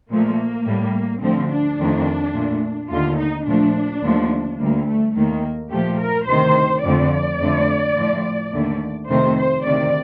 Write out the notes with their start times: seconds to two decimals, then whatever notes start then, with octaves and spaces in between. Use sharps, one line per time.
0.09 A#2 F3 A3 A#3
0.65 A2 G3
1.21 D2 D3 F3 C4
1.49 D4
1.78 F2 D#3 A3
2.34 A#2 A3
2.90 D#2 D3 A3 F4
3.18 D#4
3.46 A#2 F3 A3 D4
4.02 D#2 D3 F3 A3
4.59 D2 D3 G3 A#3
4.86 A3
5.14 D#2 D#3 A3 A#3
5.70 A#2 F3 A3 G4
6.00 A#4
6.27 D2 C3 D#3 C5
6.83 F2 D3 F3 A3 D5
7.40 F2 D3 A3
7.96 A2 F3 A3
8.52 D#2 D3 A3
9.08 F2 C3 D#3 A3 C5
9.36 C5
9.64 D2 C3 D#3 D5